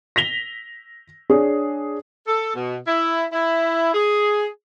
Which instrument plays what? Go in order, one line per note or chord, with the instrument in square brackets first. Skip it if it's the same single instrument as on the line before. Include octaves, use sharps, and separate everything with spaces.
[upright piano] A#6 B6 F7 G7
D4 G#4 C#5
[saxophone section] A4
B2
E4
E4
G#4